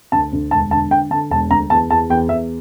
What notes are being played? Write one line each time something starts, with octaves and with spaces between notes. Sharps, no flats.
D2 A5
D2
E1 A5
D3 A5
D3 G5
D3 A5
E1 A5
D2 A#5
E2 A5
E2 A5
E2 G5
E2 E5